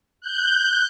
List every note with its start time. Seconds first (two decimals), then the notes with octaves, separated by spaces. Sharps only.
0.21 F#6 G6